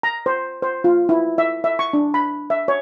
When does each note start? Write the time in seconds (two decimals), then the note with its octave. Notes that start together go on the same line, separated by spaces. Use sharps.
0.03 A#5
0.26 C5
0.62 C5
0.84 F4
1.09 E4
1.38 E5
1.64 E5
1.79 C#6
1.93 D4
2.14 B5
2.50 E5
2.68 C#5